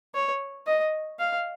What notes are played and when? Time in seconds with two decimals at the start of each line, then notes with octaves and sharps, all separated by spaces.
0.14 C#5
0.67 D#5
1.19 F5